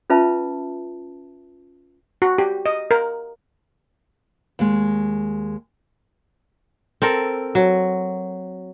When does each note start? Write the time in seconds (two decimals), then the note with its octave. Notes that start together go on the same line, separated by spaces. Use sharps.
0.10 C#4 F4 B4 E5 A5
2.22 F#4
2.38 G4
2.66 D#5
2.91 A#4
4.59 D#2 G#3
7.02 C4 A4 A#4
7.55 F#3